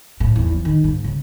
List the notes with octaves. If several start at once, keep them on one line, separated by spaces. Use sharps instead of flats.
A2
E2
F3
D#3
G#2
C#3